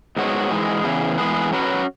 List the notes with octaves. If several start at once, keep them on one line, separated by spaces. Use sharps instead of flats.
G#2 G#3 B3 F#4 C#5
G#2 E3 G#3
C#3 E3 B3 G#4
E3 G#3 B3 G#4 B4
F#3 C#4 F#4 B4